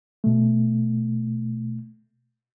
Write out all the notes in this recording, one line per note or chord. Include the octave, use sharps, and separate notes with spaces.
B2 A3